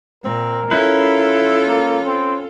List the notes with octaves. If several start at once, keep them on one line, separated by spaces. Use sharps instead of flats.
A#2 C4 A#4
C#4 E4 F4 A4 B4
A#3
C4